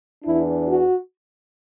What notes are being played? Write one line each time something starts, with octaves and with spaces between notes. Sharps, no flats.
E2 E3 D4 E4
F#4